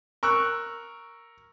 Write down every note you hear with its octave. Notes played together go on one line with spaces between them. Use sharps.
A#4 C#6 E6 F#6